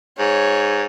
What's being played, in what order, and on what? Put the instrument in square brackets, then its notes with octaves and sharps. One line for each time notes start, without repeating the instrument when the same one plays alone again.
[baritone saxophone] G#2 [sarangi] C#5